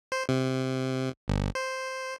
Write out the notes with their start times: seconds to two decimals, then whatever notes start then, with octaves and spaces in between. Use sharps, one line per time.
0.12 C5
0.29 C3
1.28 G1
1.55 C5